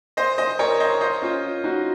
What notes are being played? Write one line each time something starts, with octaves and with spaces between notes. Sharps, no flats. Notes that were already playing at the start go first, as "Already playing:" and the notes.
C5 D#5
C5 D#5
A#4 C#5
C5 D#5
C5 D#5
C#4 F4
D#4 F#4